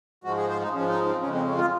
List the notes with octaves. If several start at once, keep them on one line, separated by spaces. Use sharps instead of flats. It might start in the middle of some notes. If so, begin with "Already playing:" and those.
G#2 F3 G#3 F#4
G#4
C5
D#4
G#2 F3 G#3 C#4
D#4
C4
F2 C#3 G#3 C#4
C4
C#4
F4